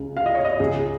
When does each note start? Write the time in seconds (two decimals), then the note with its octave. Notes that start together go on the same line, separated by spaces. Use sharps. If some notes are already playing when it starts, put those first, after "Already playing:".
Already playing: C#2 C#3
0.17 F5
0.26 D#5
0.35 C#5
0.45 D#5
0.60 C#2 C#3 G#4